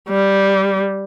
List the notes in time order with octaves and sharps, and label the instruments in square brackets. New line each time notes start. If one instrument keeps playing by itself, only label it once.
[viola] G3